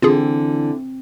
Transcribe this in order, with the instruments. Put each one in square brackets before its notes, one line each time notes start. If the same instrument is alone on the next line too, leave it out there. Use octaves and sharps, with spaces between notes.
[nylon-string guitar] D3 E3 [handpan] C4 [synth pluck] F4 G#4